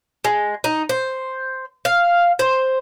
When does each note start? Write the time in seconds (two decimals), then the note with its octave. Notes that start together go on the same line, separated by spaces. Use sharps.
0.25 G#3
0.64 D#4
0.89 C5
1.85 F5
2.39 C5